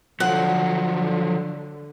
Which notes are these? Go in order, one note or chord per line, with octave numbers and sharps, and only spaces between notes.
D3 F3 F#3 F#5